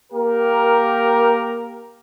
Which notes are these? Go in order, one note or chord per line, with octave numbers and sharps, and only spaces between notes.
A#3 G4 A#4